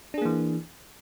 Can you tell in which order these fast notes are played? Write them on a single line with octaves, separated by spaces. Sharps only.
D4 G#4 A#3 E3